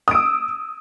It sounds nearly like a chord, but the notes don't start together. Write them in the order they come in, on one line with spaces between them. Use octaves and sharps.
D#6 D7 E6